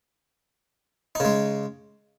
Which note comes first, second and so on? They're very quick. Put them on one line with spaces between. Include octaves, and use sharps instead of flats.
D#4 C#3 G#3